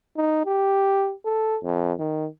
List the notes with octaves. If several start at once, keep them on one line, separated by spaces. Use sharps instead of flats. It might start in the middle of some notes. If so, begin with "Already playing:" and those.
D#4
G4
A4
F2
D#3